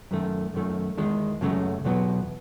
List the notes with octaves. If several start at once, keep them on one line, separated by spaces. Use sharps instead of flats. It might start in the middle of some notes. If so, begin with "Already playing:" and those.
F#2 D#3 A3
F#2 D#3 A3
E2 D#3 G#3
F#2 C#3 F#3 A3
E2 B2 F#3 B3